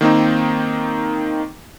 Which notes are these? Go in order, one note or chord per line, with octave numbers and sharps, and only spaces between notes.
D#3 A#3 C4 D#4